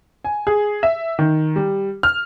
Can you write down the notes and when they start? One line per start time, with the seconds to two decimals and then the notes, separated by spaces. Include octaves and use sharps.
0.25 G#5
0.47 G#4
0.83 E5
1.19 D#3
1.56 G3
2.03 F6